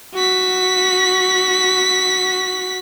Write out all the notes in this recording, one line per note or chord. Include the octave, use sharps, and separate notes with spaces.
F#4 B6